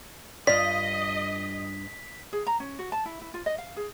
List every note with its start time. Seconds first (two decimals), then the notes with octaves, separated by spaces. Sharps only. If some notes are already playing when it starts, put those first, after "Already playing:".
0.47 G2 F4 D5 D#5 B6
2.33 G#4
2.47 A#5
2.60 C#4
2.79 F#4
2.92 A5
3.06 E4
3.21 E4
3.34 F4
3.46 D#5
3.58 F5
3.77 G#4